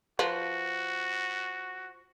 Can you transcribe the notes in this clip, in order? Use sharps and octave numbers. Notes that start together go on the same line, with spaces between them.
F3 F#4 B4